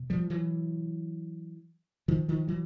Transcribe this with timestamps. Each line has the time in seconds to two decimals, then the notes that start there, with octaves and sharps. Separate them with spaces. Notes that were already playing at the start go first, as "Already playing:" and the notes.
Already playing: B2
0.10 F3 G3
0.30 E3 F#3
2.08 D#3 F3
2.28 D#3 F3
2.48 E3 F#3